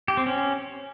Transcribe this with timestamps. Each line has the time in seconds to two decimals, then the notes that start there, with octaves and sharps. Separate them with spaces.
0.08 G4
0.17 C4
0.26 C#4